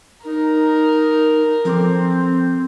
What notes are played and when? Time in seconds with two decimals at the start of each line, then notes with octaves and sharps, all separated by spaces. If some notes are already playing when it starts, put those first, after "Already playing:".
0.25 D#4 A#4
1.65 F3 C4 A4 D6